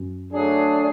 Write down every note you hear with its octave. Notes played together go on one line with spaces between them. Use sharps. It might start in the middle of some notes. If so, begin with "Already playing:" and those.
Already playing: F#2
F#3 A3 D4 G#4